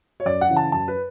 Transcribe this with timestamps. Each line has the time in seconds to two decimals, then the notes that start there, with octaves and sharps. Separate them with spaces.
0.20 C#5
0.25 F#2 D5
0.41 F#5
0.49 C#3 E3
0.57 A5
0.72 F#2 A5
0.88 B4